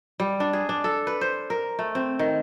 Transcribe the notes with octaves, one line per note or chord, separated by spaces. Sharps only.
G3
D4
G#4
D4
A4
B4
C5
A#4
A3
C4
D#3